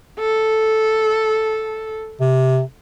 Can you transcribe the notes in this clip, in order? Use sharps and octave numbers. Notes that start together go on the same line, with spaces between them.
A4
C3